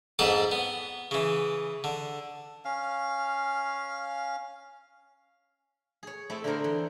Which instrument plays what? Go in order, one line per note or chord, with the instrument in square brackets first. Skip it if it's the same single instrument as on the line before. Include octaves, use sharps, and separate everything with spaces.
[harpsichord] F2 G#2 B3 A4 D5 A5
B3
C#3 E3
D3
[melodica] C#4 F5
[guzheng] G#4 C#5
A3 C4 E4
D3 A3 B3 C4 A#4 C5
E3